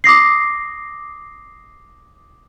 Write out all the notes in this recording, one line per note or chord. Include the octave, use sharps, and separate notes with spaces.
D6 D#6 A#6 C7